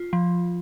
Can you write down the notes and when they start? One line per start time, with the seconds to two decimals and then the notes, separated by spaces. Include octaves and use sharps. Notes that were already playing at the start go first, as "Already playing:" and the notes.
Already playing: F4
0.13 F3